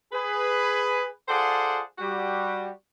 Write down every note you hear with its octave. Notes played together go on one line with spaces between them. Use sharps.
G#4 B4
F4 G#4 A4 C5 D5 F#5
G3 F#4 G4